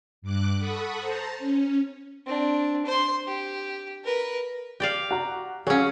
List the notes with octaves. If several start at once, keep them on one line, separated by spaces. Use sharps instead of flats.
G2 D6 F#6
A4 F#5 B5 C#6 D#6
C5 A5 A#5
C#4
C4 D4
C5 C6
G4
A#4 B4
G4 D5 F5
F#4 A#5
F#3 C#4 G#4 F5